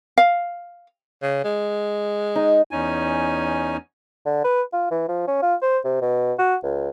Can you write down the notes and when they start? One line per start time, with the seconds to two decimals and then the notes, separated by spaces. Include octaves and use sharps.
0.18 F5
1.23 C#3
1.44 G#3
2.36 D#4
2.71 E2 C#4 D#4 G#5
4.26 D3
4.44 B4
4.73 F4
4.90 E3
5.09 F3
5.27 C#4
5.42 F4
5.62 C5
5.85 C3
6.02 B2
6.38 F#4
6.63 C#2